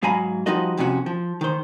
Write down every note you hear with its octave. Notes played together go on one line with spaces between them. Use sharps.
G#2 F#3 F5 G#5 A#5 B5
F3 G3 D#4 F4 F#4 D#5
F2 C3 C#4 E4 F#4
F3
D#3 C5